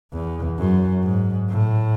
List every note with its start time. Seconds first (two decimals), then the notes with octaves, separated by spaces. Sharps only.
0.13 E2
0.58 F#2
1.03 G#2
1.49 A2